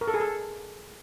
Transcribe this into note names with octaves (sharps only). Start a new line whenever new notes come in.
A#4
A4
G#4
A4